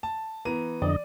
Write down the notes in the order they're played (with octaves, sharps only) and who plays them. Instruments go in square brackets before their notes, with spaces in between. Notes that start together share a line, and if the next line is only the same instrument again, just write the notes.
[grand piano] A5
[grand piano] E3 A#5 D#7 [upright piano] B3
[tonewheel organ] F2 D3 D#5 [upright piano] D5